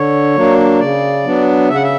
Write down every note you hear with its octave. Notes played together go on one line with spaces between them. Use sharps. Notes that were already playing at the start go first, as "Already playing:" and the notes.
Already playing: D3 C#5
F#3 A#3 D4
C#3 D5
F#3 B3 D4
C#3 E5
F#5
E5